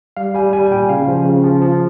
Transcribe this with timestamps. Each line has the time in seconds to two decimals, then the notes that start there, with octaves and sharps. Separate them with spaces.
0.17 G3 F5
0.34 G3 G#5
0.53 G3 G#5
0.67 G#5
0.71 A#2 G5
0.89 C#3 F5
1.08 F3
1.25 C#3
1.44 F3
1.62 F3